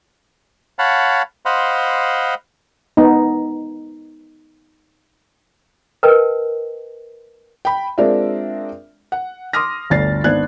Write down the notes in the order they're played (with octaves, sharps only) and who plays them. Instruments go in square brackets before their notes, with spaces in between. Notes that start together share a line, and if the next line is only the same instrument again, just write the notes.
[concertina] C#5 F5 F#5 A5 B5
C5 D#5 F5 F#5 B5 C6
[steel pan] B3 D#4
[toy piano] A#4 B4 D#5 G5 A5
[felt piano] G5 B5
G#3 C4 D4 F4 A#4 E5
F#5
C6 D6 D#6 F6 A#6
G1 D2 D4 A6 C7
G#1 B3 D4 F#6 G#6